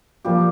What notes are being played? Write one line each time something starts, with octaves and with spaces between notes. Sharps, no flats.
F3 G3 A#3 F4 G4